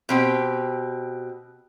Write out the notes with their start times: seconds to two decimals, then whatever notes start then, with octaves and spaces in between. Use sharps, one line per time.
0.09 B2 C4 G4